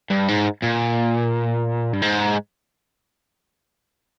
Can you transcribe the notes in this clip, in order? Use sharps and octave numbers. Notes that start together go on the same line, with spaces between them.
G2
G#2
A#2
G2
G#2